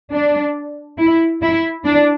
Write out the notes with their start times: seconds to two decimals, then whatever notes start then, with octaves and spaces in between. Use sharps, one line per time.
0.12 D4
0.98 E4
1.42 E4
1.85 D4